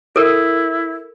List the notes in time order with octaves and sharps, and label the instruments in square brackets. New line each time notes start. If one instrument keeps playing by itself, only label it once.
[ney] E4 [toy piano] A4 A#4